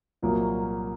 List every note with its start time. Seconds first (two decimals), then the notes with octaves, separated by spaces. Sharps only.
0.22 C2 A#2 F#3 A#3